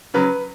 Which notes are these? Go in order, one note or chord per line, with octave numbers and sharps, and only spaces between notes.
C#3 F#3 B4